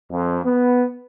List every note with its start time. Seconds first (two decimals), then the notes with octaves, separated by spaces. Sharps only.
0.11 F2
0.44 B3